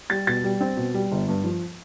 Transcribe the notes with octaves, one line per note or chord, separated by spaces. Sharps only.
G3 A6
B2 A6
G3
C4
B2
G3
G1
G2
F3